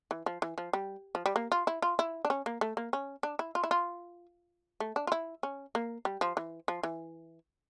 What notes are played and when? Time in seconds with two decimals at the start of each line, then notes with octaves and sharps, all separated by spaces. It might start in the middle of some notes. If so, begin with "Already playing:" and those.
0.11 E3
0.26 F3
0.42 E3
0.58 F3
0.73 G3
1.15 F3
1.26 G3
1.36 A#3
1.52 F4
1.67 E4
1.82 F4
1.99 E4
2.25 D4
2.30 C#4
2.46 A#3
2.61 A3
2.77 A#3
2.93 C#4
3.23 D4
3.39 E4
3.55 F4
3.64 E4
3.71 F4
4.80 A3
4.96 D4
5.07 F4
5.12 E4
5.43 C#4
5.75 A#3
6.05 G3
6.21 F3
6.37 E3
6.68 F3
6.83 E3